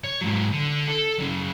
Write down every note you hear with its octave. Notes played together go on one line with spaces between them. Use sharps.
C#5
G#2 F#3
D3
A4
F#2 C#3